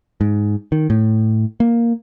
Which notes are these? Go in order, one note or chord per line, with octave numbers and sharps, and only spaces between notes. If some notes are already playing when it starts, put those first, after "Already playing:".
G#2
D#3
A2
A#3